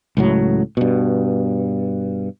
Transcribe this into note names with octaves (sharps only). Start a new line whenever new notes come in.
C#2 A2 F#3
G2 B2